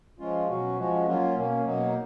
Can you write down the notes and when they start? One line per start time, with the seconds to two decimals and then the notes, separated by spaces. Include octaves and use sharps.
0.19 F3 G#3 C#4 F4
0.48 B2 F#3 C#4 F#4
0.77 F3 G#3 C#4 F#4
1.06 F#3 A#3 C#4 F4
1.35 B2 A#3 C#4
1.65 B2 F#3 A#3 D#4